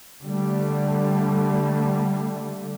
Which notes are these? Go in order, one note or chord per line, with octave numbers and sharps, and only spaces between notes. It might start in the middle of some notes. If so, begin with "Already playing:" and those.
D3 G3 A3